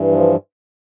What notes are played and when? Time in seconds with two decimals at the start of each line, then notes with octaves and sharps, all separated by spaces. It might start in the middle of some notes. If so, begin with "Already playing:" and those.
Already playing: G2 E3
0.12 F3